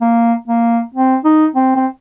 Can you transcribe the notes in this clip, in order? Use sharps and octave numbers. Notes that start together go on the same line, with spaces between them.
A#3
A#3
C4
D#4
C4
C4